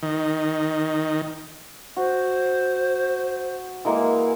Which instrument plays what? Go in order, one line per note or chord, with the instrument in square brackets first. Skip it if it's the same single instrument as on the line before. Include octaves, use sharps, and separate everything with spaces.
[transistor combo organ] D#3
[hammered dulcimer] F#4 [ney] C5
[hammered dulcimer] E3 G#3 A#3